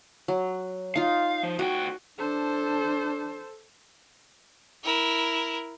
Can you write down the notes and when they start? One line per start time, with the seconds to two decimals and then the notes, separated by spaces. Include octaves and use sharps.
0.28 F#3
0.96 D#4 F4 F5
1.43 F3
1.59 D2 F#4 G5
2.18 D4 A4 C5
4.84 E4 A#4